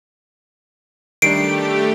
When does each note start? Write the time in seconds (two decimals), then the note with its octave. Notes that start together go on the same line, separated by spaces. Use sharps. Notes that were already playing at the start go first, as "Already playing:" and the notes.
1.22 D#3 G3 A3 D4 G4 C7 D7